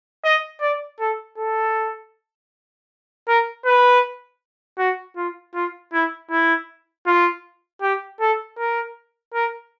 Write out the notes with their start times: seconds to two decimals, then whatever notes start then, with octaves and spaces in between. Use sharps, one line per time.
0.24 D#5
0.61 D5
0.99 A4
1.38 A4
3.28 A#4
3.66 B4
4.78 F#4
5.16 F4
5.54 F4
5.93 E4
6.31 E4
7.06 F4
7.82 G4
8.20 A4
8.58 A#4
9.34 A#4